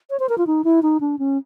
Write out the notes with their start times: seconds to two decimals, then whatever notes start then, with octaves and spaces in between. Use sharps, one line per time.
0.10 C#5
0.19 C5
0.29 A#4
0.38 F4
0.47 D#4
0.64 E4
0.82 D#4
1.00 D4
1.19 C#4